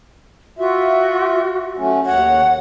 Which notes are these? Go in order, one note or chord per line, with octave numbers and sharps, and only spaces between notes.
F4 F#4 E5
F#3 A3 C#4
D#2 C#5 F#5